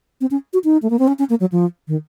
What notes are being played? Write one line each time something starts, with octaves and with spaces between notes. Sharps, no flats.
C4
C#4
F#4
D#4
A3
A#3
C4
C#4
C#4
A#3
F#3
F3
D#3